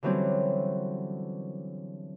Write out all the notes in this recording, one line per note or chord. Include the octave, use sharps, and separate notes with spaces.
D3 E3 F#3 G3 C4 C#4